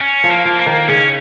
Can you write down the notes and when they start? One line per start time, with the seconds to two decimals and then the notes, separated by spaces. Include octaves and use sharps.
0.01 C#4
0.24 F3
0.31 A#3
0.45 F3
0.59 A#3
0.66 D#3
0.88 C#3 C#4